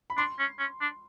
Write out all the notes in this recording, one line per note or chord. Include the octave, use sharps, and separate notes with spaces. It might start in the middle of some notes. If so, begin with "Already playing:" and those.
B5
D4 C6
C#4
C#4
D4